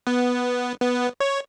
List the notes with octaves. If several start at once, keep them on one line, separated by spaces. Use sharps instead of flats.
B3
B3
C#5